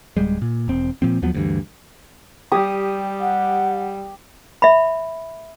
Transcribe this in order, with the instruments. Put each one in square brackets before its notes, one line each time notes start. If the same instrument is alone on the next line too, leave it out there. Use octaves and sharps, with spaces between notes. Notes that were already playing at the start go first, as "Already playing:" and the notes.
[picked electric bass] D1 G3 G#3
A#2
E1 C4
A#2 F3 C4
D#2 F3 F#3 B3
D2 G2 E3
[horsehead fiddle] G3 [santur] G4 D#6
[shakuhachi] F#5
[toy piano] E5 B5